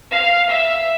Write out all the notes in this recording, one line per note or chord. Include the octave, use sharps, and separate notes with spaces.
F5
E5